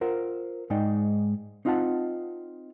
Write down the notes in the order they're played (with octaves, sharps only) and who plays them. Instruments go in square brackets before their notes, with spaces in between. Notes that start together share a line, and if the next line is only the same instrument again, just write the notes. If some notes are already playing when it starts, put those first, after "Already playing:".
[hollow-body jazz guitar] F4 A#4 C5 F#5
G#2 G#3 D#4 D5 G5
C4 D#4 F4 F5 F#5 A5